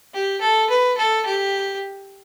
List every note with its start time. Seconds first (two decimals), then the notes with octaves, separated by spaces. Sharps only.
0.14 G4
0.41 A4
0.70 B4
0.98 A4
1.26 G4